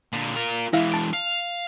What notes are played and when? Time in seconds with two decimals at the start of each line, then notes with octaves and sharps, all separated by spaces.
0.13 A#2 D3
0.36 F4 A#4
0.73 E3 G#3 E4 E5 F5
0.92 A5 D7
1.13 F5